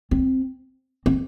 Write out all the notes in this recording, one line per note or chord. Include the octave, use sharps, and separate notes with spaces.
C4
C4